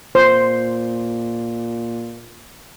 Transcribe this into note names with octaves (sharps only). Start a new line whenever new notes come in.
A#2 C5